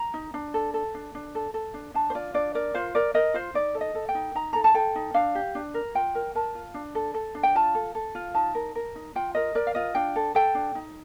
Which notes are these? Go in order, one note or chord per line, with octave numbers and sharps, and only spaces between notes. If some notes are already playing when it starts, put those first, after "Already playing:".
Already playing: A#5
D#4
D4
A4
A4
D4
D4
A4
A4
D4
D4 A5
C5
F4 D5
D4 D5
A#4 D5
F4 C5
A#4 D5
A#4 D#5
F4 C5
D#4 D5
A4
D#5
A4
G5
D#4
D#4 A#5
A4 A#5
A5
A4 G5
D#4
D4 F5
G4
D4
A#4
F4 G5
A#4
A#4 A5
F4
D4
A4
A4
D4
G5
F4 A5
A4
A4
F4
D#4 A5
A#4
A#4
D#4
F4 G5
A#4 D#5
A#4 D5
F5
F4 D#5
D4 G5
A4
A4 G5
D4
D#4